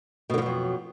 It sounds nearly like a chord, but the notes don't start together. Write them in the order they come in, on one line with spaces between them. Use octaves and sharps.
B2 D3 F3 F#3 F2